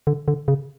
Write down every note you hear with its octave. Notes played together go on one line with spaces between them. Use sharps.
D3
D3
C#3